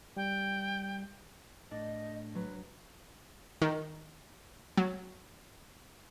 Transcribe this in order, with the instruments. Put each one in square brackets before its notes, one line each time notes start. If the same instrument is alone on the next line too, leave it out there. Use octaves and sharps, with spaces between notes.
[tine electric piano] G3 [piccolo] G5
[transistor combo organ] A2 [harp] D4 [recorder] D#5
[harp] F#3 [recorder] B4
[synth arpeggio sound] D#3
F#3